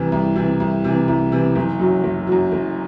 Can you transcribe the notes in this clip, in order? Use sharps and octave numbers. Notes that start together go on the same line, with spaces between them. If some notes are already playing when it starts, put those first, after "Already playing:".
Already playing: C2 C3 E3
C2
C3 E3
C2
C3 E3
C2
C3 E3
F#1
F#2 F#3
F#1
F#2 F#3
F#1